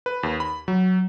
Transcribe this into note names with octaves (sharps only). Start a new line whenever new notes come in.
B4
D#2
B5
F#3